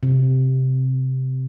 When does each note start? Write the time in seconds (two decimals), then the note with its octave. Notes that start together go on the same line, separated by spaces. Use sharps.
0.03 C3